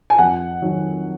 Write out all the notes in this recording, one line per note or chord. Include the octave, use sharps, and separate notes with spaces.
G#5
F2 F#5
D#3 F#3